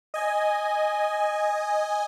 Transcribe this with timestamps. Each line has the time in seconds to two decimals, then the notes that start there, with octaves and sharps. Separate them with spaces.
0.14 D#5 G#5